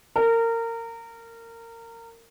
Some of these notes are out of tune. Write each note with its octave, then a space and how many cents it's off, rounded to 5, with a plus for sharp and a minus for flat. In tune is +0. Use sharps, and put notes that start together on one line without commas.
A#4 -25